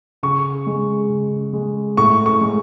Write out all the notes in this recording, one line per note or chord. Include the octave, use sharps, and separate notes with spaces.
C#3 C#6
G#3
C#3
G#3
A2 C#6
C#6
G#3